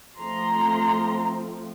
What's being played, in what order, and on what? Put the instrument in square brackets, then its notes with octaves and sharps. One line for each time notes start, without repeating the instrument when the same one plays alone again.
[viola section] F3 A3 C4 A#5 C6